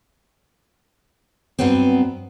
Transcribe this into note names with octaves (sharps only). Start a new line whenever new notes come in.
G2 F#3 B3 C4